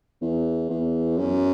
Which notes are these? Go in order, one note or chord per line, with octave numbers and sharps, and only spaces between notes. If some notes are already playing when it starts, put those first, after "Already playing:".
E2
E2
F#2